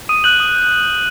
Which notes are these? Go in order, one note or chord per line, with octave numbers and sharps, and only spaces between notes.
D#6 D#7
F#6 G6 F#7
D#6
G6